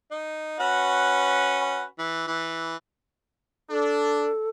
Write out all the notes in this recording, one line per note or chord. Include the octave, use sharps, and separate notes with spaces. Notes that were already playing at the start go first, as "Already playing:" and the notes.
D#4
C#4 F#4 B4
E3
E3
D4 A4